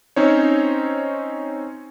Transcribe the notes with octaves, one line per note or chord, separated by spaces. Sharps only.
C4 C#4 D#4 C5 C#5